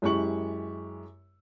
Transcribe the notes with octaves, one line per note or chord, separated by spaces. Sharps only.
F#2 G#3 E4 G4 C#6 F#7